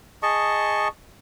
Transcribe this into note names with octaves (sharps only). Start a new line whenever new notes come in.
G#4 D#5 A5 C#6